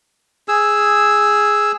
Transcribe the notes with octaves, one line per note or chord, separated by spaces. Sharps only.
G#4 E6